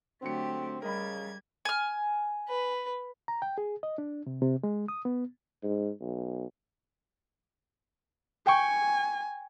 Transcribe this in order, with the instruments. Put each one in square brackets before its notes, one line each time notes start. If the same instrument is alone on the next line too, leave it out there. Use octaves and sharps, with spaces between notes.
[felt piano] D3 F#3 C#7 [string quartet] A3 G4 [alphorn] C4
[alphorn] C#3 [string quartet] G3 G#6 [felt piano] A#4 D#5 B5
[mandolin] G#5 F6
[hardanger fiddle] B4
[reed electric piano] A#5
G5
G#4
D#5
D4
C3
C3
G#3
D#6
B3
[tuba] G#2
B1
[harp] G5 C#6 [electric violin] G#5